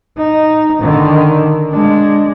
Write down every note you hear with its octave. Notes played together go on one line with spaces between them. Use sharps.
D#4
D3 D#3
G#3 D4